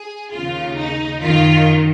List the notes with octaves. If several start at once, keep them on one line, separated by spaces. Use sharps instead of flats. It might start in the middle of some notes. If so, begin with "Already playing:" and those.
Already playing: G#4
D#2 C#3 F4
D#4
F#2 D#3 F4